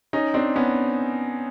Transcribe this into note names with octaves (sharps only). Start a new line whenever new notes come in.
C#4 D#4
C4 D4
B3 C#4